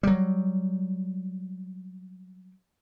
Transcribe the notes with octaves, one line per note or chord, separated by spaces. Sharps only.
F#3 G3